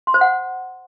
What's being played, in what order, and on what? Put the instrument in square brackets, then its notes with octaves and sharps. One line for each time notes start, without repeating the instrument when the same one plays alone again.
[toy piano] C6
C5
F#5